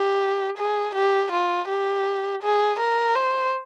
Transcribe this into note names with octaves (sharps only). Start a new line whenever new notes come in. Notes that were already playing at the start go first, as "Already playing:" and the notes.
Already playing: G4
G#4
G4
F4
G4
G#4
A#4
C5